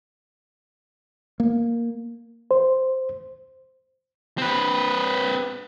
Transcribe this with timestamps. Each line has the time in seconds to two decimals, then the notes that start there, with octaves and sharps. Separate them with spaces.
1.40 A#3
2.51 C5
4.38 C4 B4